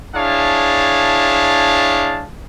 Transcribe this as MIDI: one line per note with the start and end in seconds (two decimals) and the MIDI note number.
0.15 2.26 62
0.15 2.26 64
0.15 2.26 68
0.15 2.26 73
0.15 2.26 77
0.15 2.26 81